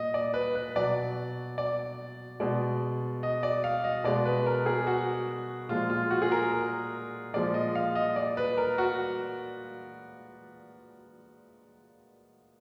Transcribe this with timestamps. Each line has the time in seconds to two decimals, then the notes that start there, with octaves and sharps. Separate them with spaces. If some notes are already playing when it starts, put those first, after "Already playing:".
Already playing: A#2 D#5
0.14 D5
0.34 B4
0.55 B4
0.76 B2 F#3 D5
1.58 D5
2.40 B2 G#3 D5
3.23 D#5
3.43 D5
3.64 F5
3.84 D#5
4.04 B2 G#3 D5
4.25 B4
4.46 A#4
4.66 G#4
4.87 F#4
5.69 A#2 F3 G#3 F4
5.90 F4
6.10 F#4
6.22 G#4
6.32 A#4
6.52 A#4
7.33 A#2 F3 G#3 D5
7.54 D#5
7.75 F5
7.95 D#5
8.16 D5
8.37 B4
8.57 A#4
8.78 F#4